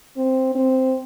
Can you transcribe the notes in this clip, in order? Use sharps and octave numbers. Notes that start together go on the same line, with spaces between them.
C4
C4